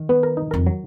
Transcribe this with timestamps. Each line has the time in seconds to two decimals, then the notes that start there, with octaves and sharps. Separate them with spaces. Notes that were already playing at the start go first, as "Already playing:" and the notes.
Already playing: D#3
0.09 B3
0.23 A#4
0.37 D#4
0.51 F2 A#4
0.67 F#3